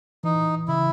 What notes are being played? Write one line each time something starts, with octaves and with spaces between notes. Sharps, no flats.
E3 D#4
C#3 E4